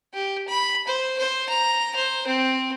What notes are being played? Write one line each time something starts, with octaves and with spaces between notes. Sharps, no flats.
G4
B5
C5
C5
A#5
C5
C4